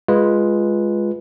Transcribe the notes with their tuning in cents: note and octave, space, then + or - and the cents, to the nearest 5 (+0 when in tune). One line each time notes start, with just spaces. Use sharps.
G#3 +0 F4 +0 B4 -10